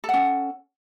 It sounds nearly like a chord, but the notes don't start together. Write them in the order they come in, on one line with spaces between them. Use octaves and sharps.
A4 F#5 C#4